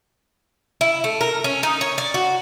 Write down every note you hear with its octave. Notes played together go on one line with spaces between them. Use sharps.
E4
A3
A#4
C#4
D#4
C#5
D5
F#4